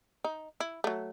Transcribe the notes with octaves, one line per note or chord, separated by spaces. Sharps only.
D#4
E4
F#3 A3